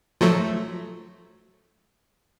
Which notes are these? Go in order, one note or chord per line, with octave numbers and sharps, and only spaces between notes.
F3 F#3 A3